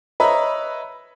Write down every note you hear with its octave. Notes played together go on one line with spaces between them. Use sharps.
B4 C#5 D#5 E5 A#5 B5